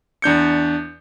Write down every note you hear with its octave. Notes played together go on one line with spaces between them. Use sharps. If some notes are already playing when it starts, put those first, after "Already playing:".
E2 D4 G6 C#7